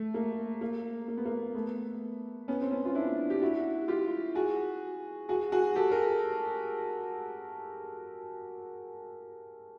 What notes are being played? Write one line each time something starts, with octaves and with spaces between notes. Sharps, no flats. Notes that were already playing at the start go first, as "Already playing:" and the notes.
Already playing: A3
A#3
A#3
A#3
B3
A#3
A3 B3
B3 C#4
C4
B3 C#4
F4
D4 E4
G4
E4 F#4
F4 G4
F#4 G#4
F#4 G#4
F#4 G#4
G4 A4
G#4 A#4